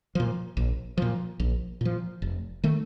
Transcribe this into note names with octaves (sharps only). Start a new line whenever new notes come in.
A#2 F3
A#1
A#2 F3
A#1
A#2 F3
F1
D#3 A3